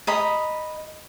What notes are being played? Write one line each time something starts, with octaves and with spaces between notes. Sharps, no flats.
D#5 A#5 B5